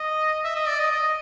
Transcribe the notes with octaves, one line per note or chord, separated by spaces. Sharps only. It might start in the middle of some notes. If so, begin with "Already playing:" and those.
Already playing: D#5
E5
D#5
D5
D#5
D#5